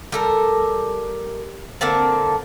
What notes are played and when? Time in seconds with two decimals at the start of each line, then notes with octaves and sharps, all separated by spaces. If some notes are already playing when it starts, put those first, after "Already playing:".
0.12 G3 A4 A#4
1.81 D3 A#3 C4 A5